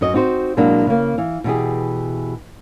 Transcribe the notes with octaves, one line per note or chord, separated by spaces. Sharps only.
F#2 F#4 D#5
C4 D#4 F#4 B4 C5
B2 F#3 G#3 A#3 D4 E4
C#3 A#3
E3 F5
B2 E3 G4 G#4